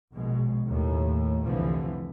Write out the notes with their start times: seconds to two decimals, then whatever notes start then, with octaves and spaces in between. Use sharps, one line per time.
0.12 A#1 B2 G#3
0.66 D#2 A2
1.45 F1 C2 D3 E3 F3